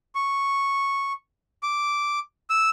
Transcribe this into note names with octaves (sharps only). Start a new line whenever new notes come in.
C#6
D6
E6